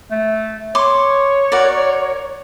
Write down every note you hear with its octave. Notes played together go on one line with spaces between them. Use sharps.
A3
C#5 C6 D6
F#4 A#4 D5